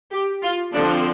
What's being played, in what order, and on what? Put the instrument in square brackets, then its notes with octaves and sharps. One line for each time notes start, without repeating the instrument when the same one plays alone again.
[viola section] G4
F4
D3 F3 C4 D4